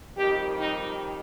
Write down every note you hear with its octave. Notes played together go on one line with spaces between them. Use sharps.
F2 D#3 G3 G4
D#4